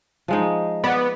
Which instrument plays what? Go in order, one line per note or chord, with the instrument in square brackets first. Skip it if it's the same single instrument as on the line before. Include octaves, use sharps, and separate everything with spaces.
[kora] F3 G#3 D#4
[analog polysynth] B3 [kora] D5